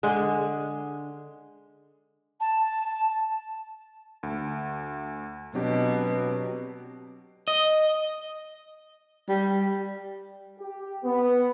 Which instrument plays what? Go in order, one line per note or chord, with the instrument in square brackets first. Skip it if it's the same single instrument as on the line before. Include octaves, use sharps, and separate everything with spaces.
[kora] D3 G#3
[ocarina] A5
[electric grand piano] D2
[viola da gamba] B2 [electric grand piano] F#3 D4 G4 [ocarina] C4
[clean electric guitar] D#5
[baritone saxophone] G3
[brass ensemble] G4
B3